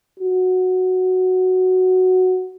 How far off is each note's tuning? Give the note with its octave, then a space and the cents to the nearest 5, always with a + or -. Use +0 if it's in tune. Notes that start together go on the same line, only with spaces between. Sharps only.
F#4 +0